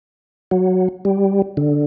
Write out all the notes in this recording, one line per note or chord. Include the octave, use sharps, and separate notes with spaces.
F#3
G3
D3